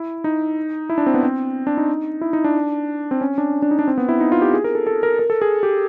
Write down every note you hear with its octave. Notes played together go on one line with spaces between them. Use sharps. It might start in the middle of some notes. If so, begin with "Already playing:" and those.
Already playing: E4
D#4
E4
D4
C4
B3
C4
D4
D#4
E4
D#4
D4
C4
C#4
D4
D4
D#4
D4
C4
B3
E4
D#4
F4
G4
G#4
A#4
A4
A4
A#4
A#4
A4
G#4
G4